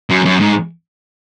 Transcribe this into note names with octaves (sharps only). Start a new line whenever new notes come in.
F#2
F#2
G#2